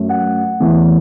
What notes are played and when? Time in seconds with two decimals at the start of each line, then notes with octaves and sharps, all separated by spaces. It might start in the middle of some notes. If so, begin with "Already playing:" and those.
Already playing: F#2 F#3 A3
0.09 F#5
0.60 E2 E3 A3